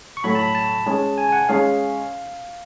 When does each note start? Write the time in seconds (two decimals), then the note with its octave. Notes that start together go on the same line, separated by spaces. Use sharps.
0.17 C#6
0.24 A2 F#3 A3 B5
0.35 A5
0.39 B5
0.55 A5
0.86 G#3 C#4 G#4
1.18 G#5
1.29 G#5
1.32 F#5
1.49 G#3 C#4 G#4 F5